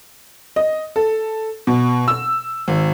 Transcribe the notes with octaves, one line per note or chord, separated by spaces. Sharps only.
D#5
A4
B2
E6
G#1